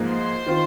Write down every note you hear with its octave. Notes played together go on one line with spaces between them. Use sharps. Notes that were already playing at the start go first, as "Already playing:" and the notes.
Already playing: G#2 F3 A#3 G#4
C5 C6
D#3 C4 F4